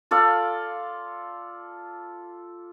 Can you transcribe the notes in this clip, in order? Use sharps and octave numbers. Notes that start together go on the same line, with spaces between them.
F4 A4 D5 F5